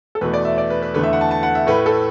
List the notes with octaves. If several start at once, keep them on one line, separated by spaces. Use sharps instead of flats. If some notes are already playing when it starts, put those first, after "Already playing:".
A4
E2 B2 A3 B4
D5
E5
D5
B4
B4
E2 D3 A3 B4
E5
F#5
A5
A5
F#5
E5
A2 A3 B4
A4